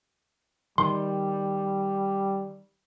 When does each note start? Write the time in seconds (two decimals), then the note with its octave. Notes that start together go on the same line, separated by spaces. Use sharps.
0.78 D#3 G3 C6